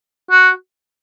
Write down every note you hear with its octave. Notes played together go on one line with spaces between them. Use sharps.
F#4